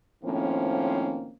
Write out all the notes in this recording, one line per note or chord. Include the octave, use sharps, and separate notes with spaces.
A2 D#3 F3 A#3 C4 C#4